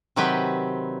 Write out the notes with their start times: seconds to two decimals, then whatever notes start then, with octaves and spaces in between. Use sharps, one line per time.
0.16 C3 D#3 F#3 C4 G4 B4